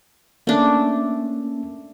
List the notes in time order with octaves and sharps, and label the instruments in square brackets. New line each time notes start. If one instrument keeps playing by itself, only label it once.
[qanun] A3 D4 [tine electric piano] A#3 C#4